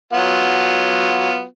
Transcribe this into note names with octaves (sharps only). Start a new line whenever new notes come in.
F#3 B3 F4